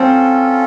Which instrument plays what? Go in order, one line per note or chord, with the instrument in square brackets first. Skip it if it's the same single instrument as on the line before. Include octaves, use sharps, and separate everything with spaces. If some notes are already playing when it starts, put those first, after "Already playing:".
Already playing: [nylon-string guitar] C4 [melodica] C#4 F4 A4